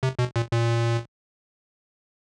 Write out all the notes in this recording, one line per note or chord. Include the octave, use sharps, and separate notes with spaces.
C3
B2
A#2
A#2